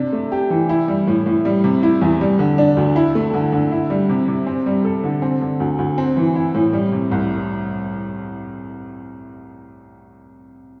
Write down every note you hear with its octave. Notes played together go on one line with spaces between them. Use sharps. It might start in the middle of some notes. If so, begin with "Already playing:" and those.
Already playing: C3 D4
A3
G4
E3
E4
G3
A2
A2
G3
C3
E4
E2
G3
D3
D4
D2
E4
A3
D3
D3
E4
G3
C3
C3
C4
G3
A4
D3
C4
D3
D2
D2
C4
E3
E4
A2
G3
C3
C2